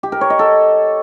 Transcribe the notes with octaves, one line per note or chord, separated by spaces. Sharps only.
G4
A#4
C#5
D#5
A4